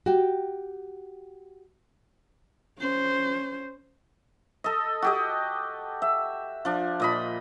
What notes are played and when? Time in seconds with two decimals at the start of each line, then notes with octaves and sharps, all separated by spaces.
0.06 F#4 G4 G5
2.78 C#4 C5
4.64 A4 D#5
5.02 F#4 G4 D#5
6.02 E5
6.65 F3 D4
7.00 A#2 D#5 B5